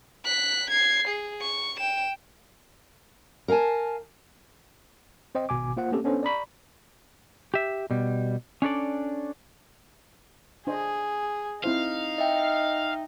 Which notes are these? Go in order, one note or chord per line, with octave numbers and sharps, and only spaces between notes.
F#6 B6
G#6 C7
G#4
C#6
G5 E7
A#4 F5 F#5 G#5 A5
C4 C5 D#5 G5
G#1 B2 G#5 D6
A#3 F4 C5 F#5
A3 A#3 C4 C#4 G4 A4
B3 C#4 D4 A4 C5
D5 A#5 B5 C#6
G4 E5
B2 G3
C#4 D4 A4 D5
D4 G#4 C5 D#5
C4 D#4 E4 C5 F5
D#5 E5 G5